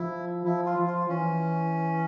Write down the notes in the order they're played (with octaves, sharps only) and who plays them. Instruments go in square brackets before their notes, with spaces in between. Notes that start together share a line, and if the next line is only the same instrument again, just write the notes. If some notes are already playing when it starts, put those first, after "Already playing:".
Already playing: [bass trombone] F3 [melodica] E4
[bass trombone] F3 [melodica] E4
[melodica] F4
[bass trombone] F3
[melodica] F4
[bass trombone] E3 [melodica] C#4